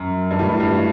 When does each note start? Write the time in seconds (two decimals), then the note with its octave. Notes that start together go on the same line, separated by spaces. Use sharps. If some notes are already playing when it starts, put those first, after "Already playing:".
Already playing: F#2
0.31 G2
0.39 A2
0.49 G2
0.60 G2
0.68 A2